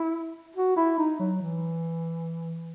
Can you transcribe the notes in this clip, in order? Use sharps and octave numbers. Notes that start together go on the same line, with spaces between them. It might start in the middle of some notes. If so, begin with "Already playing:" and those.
Already playing: E4
F#4
E4
D#4
F#3
E3